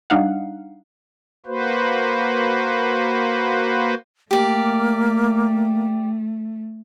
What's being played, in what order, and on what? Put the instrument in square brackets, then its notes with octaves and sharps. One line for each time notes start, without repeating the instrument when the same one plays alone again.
[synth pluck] G3 D4 D#4 F5 F#5
[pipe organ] A#3 F#4 B4 C5
[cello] A3 [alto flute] A#3 [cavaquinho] G4 D5